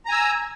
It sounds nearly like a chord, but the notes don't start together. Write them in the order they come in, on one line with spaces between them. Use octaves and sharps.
A#5 G#5 E6